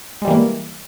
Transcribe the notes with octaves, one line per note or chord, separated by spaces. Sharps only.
E3 G3 G#3 A#3